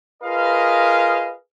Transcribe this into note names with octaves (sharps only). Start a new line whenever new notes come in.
F4 G#4 A#4 B4 D#5 F5